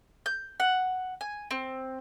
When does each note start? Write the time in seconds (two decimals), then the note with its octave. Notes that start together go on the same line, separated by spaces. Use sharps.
0.26 G6
0.60 F#5
1.21 G#5
1.51 C4